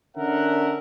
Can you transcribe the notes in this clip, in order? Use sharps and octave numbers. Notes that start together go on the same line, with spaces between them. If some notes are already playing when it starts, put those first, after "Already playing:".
D3 C#4 D4 A#4 E5 F#5